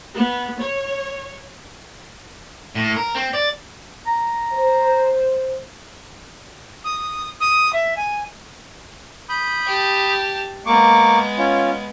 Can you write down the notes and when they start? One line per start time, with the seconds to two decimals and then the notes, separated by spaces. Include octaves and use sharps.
0.14 B3
0.60 C#5
2.75 A2
2.96 A#4
3.15 C4
3.33 D5
4.07 A#5
4.53 C5
6.84 D#6
7.40 D#6
7.73 E5
7.96 G#5
9.29 B5 D#6 G6
9.67 G4 A5
10.66 G#3 A#3 B3 C#6 D6
11.38 C#4 F4